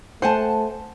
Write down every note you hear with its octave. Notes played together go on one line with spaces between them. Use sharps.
A3 C5 F#5 G#5 A5